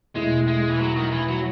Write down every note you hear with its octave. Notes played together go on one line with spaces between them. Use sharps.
E2 B2 G#3 A3 E4
G#3
E3
F#3
D#3
E3
F#3